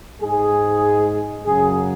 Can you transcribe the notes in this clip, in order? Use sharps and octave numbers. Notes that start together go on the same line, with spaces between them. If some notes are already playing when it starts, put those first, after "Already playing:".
G#2 G#3 G#4
F#2 C#3 F#3 G#4